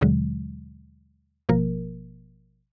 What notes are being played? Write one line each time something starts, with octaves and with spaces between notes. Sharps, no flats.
D#2 B2 D3 F#3 G#3
G#1 B2 F3 A#3 A#4